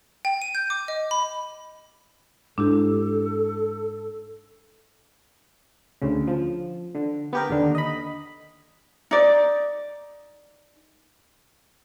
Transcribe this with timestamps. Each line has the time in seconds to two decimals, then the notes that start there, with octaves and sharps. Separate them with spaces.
0.25 G5
0.42 D#7
0.55 G6
0.70 D6
0.88 D#5
1.11 B5
2.58 G#2 D4 E4 G4 A4
6.02 D2 C#3
6.27 F3
6.95 D3
7.33 B3 G4 A#4
7.50 D#2 D3
7.75 D#5 B5
9.11 D#4 D5